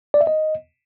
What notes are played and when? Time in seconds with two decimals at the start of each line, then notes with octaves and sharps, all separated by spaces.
0.14 D5
0.21 E5
0.27 D#5